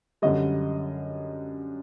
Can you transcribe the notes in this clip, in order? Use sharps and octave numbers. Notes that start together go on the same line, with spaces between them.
F#2 D3 G3 D#5